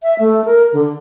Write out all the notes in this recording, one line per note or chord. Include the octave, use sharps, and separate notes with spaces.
E5
A3
A#4
D3